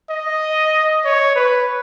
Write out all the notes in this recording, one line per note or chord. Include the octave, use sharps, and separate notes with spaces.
D#5
C#5
B4